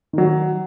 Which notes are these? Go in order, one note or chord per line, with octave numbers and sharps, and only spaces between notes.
D#3 F#3